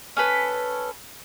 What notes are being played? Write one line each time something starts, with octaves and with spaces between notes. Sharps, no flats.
C#4 A4 B4